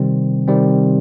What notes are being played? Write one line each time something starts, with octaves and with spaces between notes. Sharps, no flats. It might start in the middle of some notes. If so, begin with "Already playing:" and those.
Already playing: C3 D#3 G3 C4
C3 D#3 G3 C4